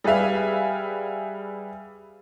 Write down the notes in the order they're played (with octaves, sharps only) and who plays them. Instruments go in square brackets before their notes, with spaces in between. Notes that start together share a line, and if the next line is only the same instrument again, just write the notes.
[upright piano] G3 G#4 B4 E5 F5